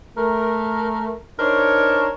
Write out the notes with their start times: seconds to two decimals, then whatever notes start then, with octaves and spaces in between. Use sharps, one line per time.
0.17 A3 A#4
1.39 D4 D#4 A#4 C5 C#5